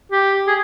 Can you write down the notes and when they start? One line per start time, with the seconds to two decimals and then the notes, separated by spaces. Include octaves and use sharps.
0.12 G4
0.47 G#4